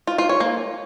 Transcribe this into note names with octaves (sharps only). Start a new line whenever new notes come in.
F4
F4
C#5
A#3